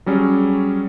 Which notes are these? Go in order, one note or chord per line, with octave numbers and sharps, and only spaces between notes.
F#3 G3 C#4 G#4 C#5